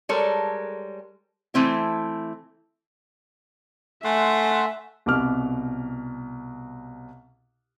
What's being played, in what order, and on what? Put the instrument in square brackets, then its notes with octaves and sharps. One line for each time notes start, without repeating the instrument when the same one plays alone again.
[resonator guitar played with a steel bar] G3 G#3 A4 A#4 C#5
E3 A3 C4 E4
[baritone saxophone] A3 [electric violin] E5 [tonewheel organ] F#5 C6 [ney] G#5
[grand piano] C2 B2 D6 F6